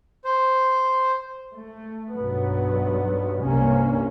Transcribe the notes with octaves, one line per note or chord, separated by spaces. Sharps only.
C5
A3
B1 G2 F#3 B3
C2 G2 C3 A#3 C#4